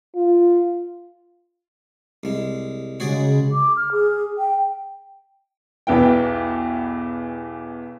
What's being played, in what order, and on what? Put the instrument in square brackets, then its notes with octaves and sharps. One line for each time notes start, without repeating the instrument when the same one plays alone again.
[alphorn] F4
[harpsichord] C2 G#3
[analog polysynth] C#3 G#3 [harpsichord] F#4 G#4 D5
[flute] D6
F6
G#4
G5
[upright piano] B1 E2 E3 B4 G5